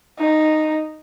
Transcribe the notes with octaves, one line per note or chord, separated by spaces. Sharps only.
D#4